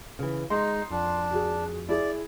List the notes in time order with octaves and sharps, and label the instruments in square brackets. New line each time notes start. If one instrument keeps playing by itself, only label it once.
[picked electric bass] C#3 E3
[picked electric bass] G#3 [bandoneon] D#4 [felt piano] C6
[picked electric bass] F2 [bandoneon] D4
[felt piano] F#4 G#4
[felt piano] E4 G#4 [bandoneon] D5